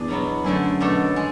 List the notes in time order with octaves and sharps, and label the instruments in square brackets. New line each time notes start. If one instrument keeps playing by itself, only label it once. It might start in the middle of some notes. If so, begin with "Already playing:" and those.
Already playing: [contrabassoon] E2 [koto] D4 G#4
[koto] B2 F#3 B3
[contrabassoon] F#2 [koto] D3 A3 E4 G#4
[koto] B2 A3 D4 A4
G#3